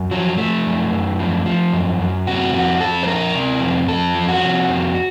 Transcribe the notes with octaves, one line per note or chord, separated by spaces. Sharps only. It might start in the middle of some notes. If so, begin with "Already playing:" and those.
Already playing: F#2
F3 F#3
F3 A3
F#2
F#2
F3
F3
F#2
F#2
C3 F#4
F2 F#4
F2 A4
C5
F3 A#4
C3
F2
F2 A4
F3
F#4
C3
F2